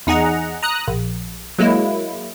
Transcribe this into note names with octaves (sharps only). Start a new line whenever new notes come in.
E2 D#4 G#4 F#5 A#5
A#5 D#6 F#6
A#1
F#3 G#3 A#3 E4